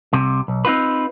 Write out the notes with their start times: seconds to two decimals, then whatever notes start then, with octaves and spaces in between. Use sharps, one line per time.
0.13 C2 C3
0.48 B1
0.65 C4 D#4 F4 B4